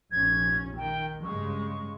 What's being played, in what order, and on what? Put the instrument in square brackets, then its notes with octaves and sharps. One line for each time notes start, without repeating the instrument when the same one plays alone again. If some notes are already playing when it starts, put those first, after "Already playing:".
[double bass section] F1 A#1 C#4 [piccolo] G#6
[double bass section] D#3 [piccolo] G5
[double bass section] G2 C#3 G#3 [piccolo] C#6